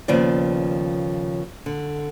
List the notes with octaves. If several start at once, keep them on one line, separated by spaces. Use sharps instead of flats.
D#2 C#3 F3 B3 D5
D3